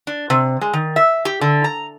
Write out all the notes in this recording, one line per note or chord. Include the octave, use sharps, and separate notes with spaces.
D4
C3
G#3
D#3
E5
G4
D3
A#5